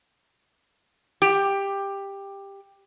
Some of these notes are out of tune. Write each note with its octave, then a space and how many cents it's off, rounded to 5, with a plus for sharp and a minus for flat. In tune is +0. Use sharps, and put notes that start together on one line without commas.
G4 +10